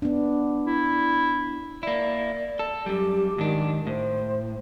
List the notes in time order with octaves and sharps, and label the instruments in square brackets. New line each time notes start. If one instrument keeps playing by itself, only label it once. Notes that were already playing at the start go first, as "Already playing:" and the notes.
[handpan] B3 D4
[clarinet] E4
[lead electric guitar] A#3 E4 [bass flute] D5
[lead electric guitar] A4
[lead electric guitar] F#2 G3 [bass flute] G4
[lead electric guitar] G#2 D4 [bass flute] D#3
[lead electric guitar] A2 [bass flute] C5